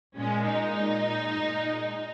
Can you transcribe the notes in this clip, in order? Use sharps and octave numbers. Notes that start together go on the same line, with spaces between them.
A#2 G#3 C#4
D#4
A#2 G#3
A#2 G#3